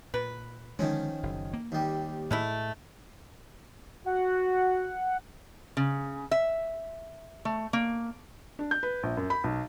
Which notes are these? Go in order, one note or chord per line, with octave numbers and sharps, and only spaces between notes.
A#2 B4
D3 D#3 F3 G#3 C#4
F#1
A#3
D#2 G3
A2 G#3 A3 E4
F#4 F#5
C#3
E5
A3
A#3
D4
G6
B4
A#1
F#2
B5
B1